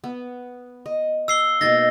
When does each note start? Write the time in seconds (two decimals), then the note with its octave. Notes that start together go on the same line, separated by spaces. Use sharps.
0.04 B3
0.86 D#5
1.28 F5 E6 C7 G7
1.61 B2 A#3 D#4 A6 A#6